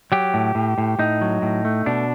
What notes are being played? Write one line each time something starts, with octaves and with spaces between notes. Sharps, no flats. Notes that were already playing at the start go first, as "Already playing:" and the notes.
F#3 G4
A2
A2
A2
A2 D#4
F#3
A2
A3
B2 D4